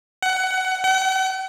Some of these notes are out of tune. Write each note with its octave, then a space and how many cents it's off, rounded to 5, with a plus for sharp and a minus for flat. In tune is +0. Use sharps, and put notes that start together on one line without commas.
F#5 +20
F#5 +45